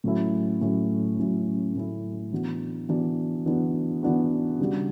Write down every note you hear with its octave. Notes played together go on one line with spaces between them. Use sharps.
A2 F#3 C#4 E4
A2 F#3 C#4 E4
A2 F#3 C#4 E4
A2 F#3 C#4 E4
E3 B3 D4 F#4
E3 B3 D4 F#4
E3 B3 D4 F#4
E3 B3 D4 F#4
C#3 G3 D4 F#4